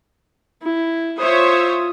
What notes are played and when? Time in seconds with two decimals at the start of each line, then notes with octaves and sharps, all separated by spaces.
0.63 E4
1.20 F4 C5 C#5 E5 D#6